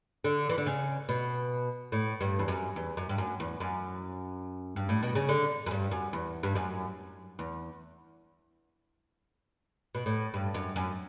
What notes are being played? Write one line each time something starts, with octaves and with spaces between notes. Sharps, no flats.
D3
E3
D3
C#3
B2
A2
G2
E2
F#2
E2
F#2
G2
F#2
E2
F#2
G2
A2
B2
C#3
D3
F#2
G2
F#2
E2
G2
F#2
E2
B2
A2
G2
F#2
F#2